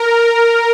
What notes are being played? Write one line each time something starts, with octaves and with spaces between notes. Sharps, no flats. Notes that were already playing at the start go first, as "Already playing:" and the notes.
Already playing: A#4